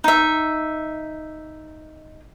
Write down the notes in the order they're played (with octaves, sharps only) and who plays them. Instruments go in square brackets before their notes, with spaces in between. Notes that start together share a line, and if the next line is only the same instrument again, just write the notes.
[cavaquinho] D#4 E5